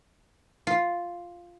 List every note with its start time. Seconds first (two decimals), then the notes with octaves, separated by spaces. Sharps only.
0.67 F4